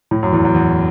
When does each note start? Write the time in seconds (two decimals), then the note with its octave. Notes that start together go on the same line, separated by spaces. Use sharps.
0.11 A2
0.23 F#2
0.33 E2
0.45 F#2
0.55 E2